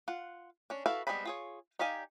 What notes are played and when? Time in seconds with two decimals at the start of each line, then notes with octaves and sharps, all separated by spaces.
0.08 F4 F#5
0.70 C#4 D4
0.86 E4 F#4 A4 B4 F5
1.07 G3 G#3 B3 C4 B5
1.25 F4 G#4 C#5
1.79 D#4 G4 D5 F5 G#5